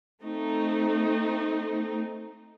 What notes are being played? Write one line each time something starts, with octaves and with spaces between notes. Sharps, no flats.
A3 C4 D#4